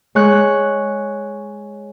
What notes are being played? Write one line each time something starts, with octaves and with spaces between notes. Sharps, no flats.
G#3 C#5 F#6